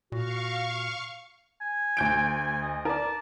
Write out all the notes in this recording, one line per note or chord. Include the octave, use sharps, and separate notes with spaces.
A#2 F#4 F5 C#6
G#5
D2 G6 D7
D#5
A#4 D5 A5